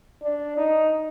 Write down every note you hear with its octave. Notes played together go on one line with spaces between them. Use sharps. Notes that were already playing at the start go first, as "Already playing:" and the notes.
D4
D#4